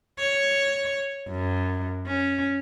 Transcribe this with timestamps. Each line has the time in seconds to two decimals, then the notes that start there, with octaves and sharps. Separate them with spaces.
0.18 C#5
1.27 F#2
2.07 C#4